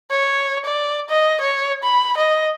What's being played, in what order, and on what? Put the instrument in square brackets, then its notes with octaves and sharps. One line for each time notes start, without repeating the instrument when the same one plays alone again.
[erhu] C#5
D5
D#5
C#5
B5
D#5